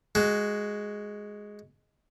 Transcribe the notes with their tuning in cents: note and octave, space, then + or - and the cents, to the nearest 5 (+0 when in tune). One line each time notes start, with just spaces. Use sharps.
G#3 +0 F#4 +5